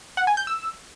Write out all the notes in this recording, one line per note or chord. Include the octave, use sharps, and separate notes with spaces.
F#5
G#5
G6
E6